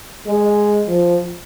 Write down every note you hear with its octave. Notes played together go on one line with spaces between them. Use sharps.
G#3
F3